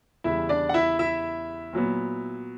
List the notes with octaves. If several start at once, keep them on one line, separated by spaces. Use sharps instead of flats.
E2 C#3 G3 E4 E5
D4 D5
F#5
E4 E5
E4 E5
A#2 F#3 B3